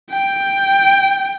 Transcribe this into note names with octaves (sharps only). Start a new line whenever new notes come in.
G5